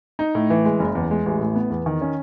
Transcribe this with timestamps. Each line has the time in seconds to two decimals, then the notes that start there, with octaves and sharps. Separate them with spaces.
0.19 D#4
0.35 A2
0.50 E3
0.65 G#3
0.80 F#1
0.95 E2
1.11 G#3
1.26 A1
1.41 A2
1.56 B3
1.70 E2
1.86 D#3
2.01 C#4